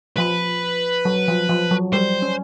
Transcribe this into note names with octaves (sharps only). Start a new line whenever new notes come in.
F3 B4
F#3
F3
F3
F#3
G3 C5
C#4